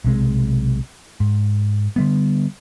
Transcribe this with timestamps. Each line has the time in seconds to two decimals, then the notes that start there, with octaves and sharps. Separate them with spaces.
0.04 B1 C3 G#3
1.20 G#2
1.96 D3 G3 B3